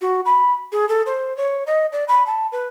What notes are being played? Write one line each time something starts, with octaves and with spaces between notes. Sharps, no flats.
F#4
B5
G#4
A4
C5
C#5
D#5
D5
B5
A5
B4